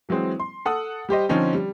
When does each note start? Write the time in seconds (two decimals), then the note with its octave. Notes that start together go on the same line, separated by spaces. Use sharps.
0.09 E3 F#3 G#3 C4
0.40 C6
0.66 A4 F#5 D#6
1.09 G3 G4 C5 D#5
1.29 D3 F3 C4 C#4 D#4
1.54 G3